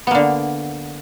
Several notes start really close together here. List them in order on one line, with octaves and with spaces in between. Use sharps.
B3 A#3 D3